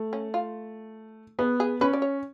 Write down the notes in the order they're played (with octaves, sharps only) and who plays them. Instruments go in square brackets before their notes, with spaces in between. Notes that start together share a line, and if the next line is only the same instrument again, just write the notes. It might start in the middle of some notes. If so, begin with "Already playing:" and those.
Already playing: [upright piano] A3
[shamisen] C#4
F4
[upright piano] B3 [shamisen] G#4
[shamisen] G#4
[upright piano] C#4 [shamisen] B4
[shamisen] D5
C#5